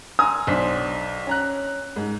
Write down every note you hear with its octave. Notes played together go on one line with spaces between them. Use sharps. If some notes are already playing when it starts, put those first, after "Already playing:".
G#5 A#5 C6 D#6 E6
B1 D4 C5 B6
C#4 A#5 F#6
G#2